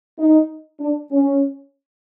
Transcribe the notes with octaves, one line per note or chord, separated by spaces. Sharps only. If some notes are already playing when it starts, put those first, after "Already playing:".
D#4
D4
C#4